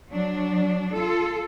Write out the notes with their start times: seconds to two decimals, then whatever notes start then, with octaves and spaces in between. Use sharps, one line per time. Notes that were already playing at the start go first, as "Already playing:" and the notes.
0.10 F#3 D4
0.95 F4 A4